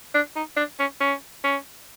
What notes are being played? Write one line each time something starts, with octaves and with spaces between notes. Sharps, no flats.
D4
D#4
D4
C#4
C#4
C#4